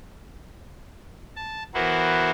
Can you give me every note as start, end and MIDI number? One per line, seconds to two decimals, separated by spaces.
1.36 1.63 81
1.74 2.31 52
1.74 2.31 59
1.74 2.31 64
1.74 2.31 66
1.74 2.31 70
1.74 2.31 72